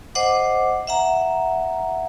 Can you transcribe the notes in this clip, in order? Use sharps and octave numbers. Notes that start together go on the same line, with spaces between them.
C5 D#5 F#5 D6
E5 F#5 A#5